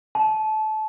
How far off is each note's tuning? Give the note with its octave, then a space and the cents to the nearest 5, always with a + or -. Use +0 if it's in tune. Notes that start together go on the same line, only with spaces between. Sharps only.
A5 -25